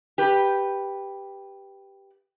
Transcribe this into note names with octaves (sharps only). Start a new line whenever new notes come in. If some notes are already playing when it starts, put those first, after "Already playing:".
G4 B4